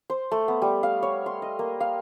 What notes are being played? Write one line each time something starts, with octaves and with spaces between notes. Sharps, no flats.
C5
A3
B3
G3
F5
C#5
C6
D#5
A#3
F5